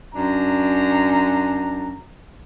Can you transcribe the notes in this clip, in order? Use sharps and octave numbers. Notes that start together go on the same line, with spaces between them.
F#2 D4 A#5